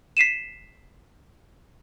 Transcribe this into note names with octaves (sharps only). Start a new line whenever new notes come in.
B6 C7 D#7 E7